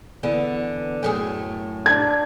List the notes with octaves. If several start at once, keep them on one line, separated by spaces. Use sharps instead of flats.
E2 D3 B3
F#2 A2 G#4
D4 G#6